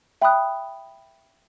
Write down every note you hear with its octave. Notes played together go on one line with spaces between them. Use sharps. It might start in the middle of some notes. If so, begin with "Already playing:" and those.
E5 G5 B5 D#6 F#6